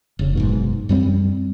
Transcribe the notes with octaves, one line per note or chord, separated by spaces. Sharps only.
F1 C#3
F#1 G#2 B2
F#2 G3 C4